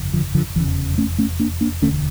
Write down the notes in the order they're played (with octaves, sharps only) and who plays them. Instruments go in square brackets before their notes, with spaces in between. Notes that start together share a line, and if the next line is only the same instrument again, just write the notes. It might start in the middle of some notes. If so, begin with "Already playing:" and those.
Already playing: [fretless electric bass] G1 F2 C#3
D3 F3
D3 F3
F1 E2 C#3 E3
A3 C#4
A3 C#4
A#3 D4
A#3 D4
E1 D2 D3 A3 C#4